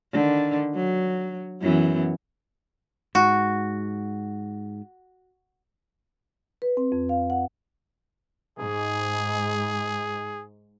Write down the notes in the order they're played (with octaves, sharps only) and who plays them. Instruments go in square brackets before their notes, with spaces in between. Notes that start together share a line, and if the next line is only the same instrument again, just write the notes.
[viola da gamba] D3 D#3
F#3
F#2 E3 B3
[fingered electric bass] G#2 [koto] F#4
[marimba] B4
C4
F2
F5
F#5
[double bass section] G#2 [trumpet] G#4